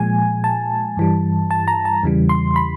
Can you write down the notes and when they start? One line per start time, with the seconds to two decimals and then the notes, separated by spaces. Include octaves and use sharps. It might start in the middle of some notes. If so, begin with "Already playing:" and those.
Already playing: A#2 F3 G#3 G#5
0.44 A5
0.97 G2 E3 G3
1.51 A5
1.68 A#5
1.85 A5
2.03 E2 C#3 E3 G3
2.29 C6
2.56 B5